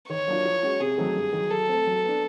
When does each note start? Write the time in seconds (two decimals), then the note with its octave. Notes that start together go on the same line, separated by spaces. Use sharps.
0.09 D#3 C#5
0.27 F#3 A#3 D4 F4
0.45 F3
0.63 G#3 C#4 F#4
0.80 C3 G#4
0.98 D#3 F#3 A3 C4
1.16 G2
1.33 D#3 F#3
1.51 F#3 A4
1.69 A3 C4
1.86 F#3
2.04 B3 D4